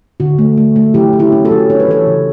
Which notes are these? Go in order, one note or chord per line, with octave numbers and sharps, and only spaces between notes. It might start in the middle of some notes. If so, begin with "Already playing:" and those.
D3 F#4
A3
A3
A3
F#3 E4 G4
F#3
E4 G4
C#4
F#4 A4
F#3
D4 C#5
B4
E3 A4 C#5
C#3